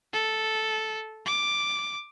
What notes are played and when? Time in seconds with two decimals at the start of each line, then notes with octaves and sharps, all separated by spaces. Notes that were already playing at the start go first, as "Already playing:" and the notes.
0.13 A4
1.26 D6